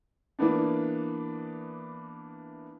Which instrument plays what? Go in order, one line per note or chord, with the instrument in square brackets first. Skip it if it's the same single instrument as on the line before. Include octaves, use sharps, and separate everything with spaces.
[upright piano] E3 A#3 B3 D4